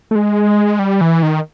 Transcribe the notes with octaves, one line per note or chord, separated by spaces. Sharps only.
A3
G#3
G3
E3
D#3